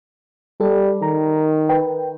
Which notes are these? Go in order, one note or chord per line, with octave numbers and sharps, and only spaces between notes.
G3 A4
D#3 A#5
B4 G5